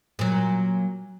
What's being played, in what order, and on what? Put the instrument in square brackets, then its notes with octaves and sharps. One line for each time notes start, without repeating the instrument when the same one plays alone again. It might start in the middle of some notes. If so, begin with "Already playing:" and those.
[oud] A#2 F#3